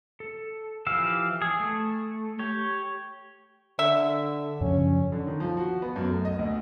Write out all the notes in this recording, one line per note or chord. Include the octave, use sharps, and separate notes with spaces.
A4
E3 F3 G4 F5 E6
G#4
A3
G4 C#5
D3 E5
F#2 C#3 F3 C#4
D3
D#3
F3
F#4
B3
F#2
A3
D#5
D2